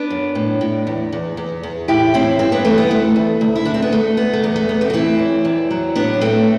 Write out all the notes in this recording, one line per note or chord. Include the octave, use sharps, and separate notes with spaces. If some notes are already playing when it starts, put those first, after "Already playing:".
Already playing: B3 D4
F#2
A2
A2
E2
E2
E2
E2
A2 E4 G4
A2 C4 E4
G2 C4 E4
B3 D4
E3 A3 C4
B3
D2 A3
D2
D2
E4
D2 D4
C4
B3
D2 A3
D2 B3
A3
E2 B3
A3
E2 B3
A3 C4
F#4
E3 C4 E4
F#2
E2
F#3
A2 B3 D4
A2 A3 C4